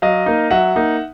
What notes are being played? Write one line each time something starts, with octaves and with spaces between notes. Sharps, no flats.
F#3 D#5 F5
A#3 D#4
F#3 E5 F#5
A#3 D#4